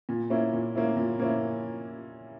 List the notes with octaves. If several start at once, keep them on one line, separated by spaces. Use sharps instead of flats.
A#2
A#3 C#4 E4
A#2
A#3 C#4 E4
A#2
A#3 C#4 E4